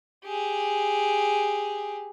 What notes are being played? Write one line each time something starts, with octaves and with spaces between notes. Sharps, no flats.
G4 G#4